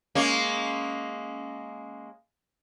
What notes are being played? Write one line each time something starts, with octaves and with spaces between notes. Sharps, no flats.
G#3 A#3 C#4